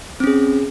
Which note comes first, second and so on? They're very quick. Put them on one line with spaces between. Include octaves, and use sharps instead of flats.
C4 C#4 G#4